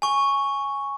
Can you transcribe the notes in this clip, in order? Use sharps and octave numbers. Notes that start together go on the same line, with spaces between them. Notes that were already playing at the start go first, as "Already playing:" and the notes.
G#5 C#6